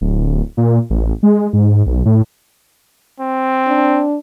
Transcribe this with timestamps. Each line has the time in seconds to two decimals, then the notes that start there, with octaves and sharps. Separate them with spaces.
0.01 D1
0.57 A#2
0.90 A1
1.23 G#3
1.53 G#2
1.86 B1
2.06 A2
3.20 C4
3.67 D4